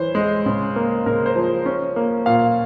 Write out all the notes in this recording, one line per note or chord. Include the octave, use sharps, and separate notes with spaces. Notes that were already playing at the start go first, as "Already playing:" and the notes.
Already playing: E3 C5 C#5
G#3
C#3
A#3
C#3 A#4
C5
F3
C#4
A#3
A#2 F5